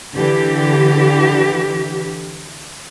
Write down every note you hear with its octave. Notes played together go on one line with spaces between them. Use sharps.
D3 E3 G4